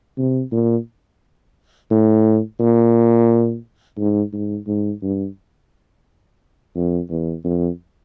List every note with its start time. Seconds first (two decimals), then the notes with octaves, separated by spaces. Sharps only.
0.18 C3
0.52 A#2
1.91 A2
2.60 A#2
3.98 G#2
4.33 G#2
4.67 G#2
5.02 G2
6.75 F2
7.10 E2
7.44 F2